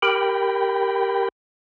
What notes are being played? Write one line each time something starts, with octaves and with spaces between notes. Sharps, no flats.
G4 A#4 G5 B5